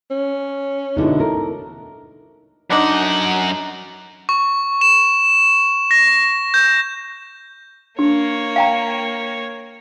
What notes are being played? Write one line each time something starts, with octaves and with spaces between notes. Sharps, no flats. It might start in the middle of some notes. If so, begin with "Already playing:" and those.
C#4
B2 D3 G#3 D#4 E4
A4 A#4
F#2 D3 D4 D#4 F#5
C#6
E7
A#6
G6
A#3 D4 C#5
F5 G5 A#5